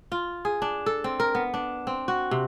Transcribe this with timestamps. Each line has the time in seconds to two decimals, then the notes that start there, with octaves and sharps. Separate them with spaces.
0.12 F4
0.45 G#4
0.62 D4
0.86 A4
1.04 C4
1.20 A#4
1.35 B3
1.54 D4
1.87 C4
2.08 F#4
2.31 C3